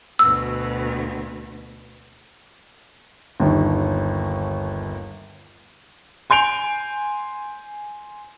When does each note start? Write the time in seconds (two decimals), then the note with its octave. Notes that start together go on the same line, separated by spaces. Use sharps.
0.19 D2 B2 E6
3.40 G1 D#2
6.30 G#5 C6 G6 D7 F7